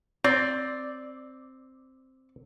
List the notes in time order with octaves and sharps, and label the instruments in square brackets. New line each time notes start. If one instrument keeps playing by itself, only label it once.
[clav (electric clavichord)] C4 [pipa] D5